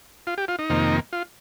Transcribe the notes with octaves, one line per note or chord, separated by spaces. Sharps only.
F4
G4
F4
D#4
F2 C3 D#3 A#3
F4